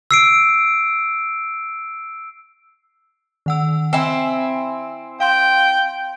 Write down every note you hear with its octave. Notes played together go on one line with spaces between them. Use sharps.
E6 C7 D7
D#3 F#5 E6
C4 E4 G#5
F5 G5 C6